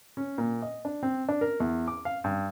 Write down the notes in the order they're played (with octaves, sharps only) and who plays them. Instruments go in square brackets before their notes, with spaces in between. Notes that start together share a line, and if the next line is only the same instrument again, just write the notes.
[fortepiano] C#4
A#2
D#5
D4
C4
D4
A#4
E2
D6
F5
G2